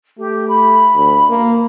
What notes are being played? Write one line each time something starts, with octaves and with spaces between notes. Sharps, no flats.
A3 G4
B5
D2
A#3